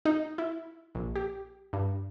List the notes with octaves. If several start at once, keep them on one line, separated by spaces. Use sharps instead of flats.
D#4
E4
A#1
G4
G2